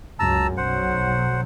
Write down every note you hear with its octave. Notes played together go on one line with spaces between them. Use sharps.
C#2 F#2 A5 A#5 E6
B1 F#3 C5 F#5